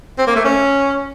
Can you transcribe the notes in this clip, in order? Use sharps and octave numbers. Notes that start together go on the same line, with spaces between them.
C4
A#3
A3
C#4